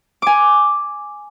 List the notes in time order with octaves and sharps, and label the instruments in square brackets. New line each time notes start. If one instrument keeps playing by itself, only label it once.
[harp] G#5 D6